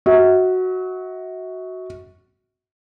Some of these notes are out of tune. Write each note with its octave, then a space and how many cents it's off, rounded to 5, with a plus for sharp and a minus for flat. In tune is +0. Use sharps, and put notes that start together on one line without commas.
F#4 +0 E5 -45